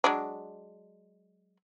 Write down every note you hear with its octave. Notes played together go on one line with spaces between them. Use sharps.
F#3 G#3 D4